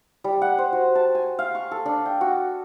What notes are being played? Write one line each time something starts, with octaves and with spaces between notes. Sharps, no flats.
G3
F#5
C5
F#4
A5
G#5
F5
C#6
A4
D4
G5
F#4